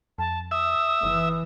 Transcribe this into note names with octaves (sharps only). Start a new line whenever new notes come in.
F2 A5
E5 D#6
F#1 E3